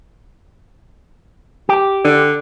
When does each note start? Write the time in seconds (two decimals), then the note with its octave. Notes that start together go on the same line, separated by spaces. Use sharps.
1.69 G4
2.05 D3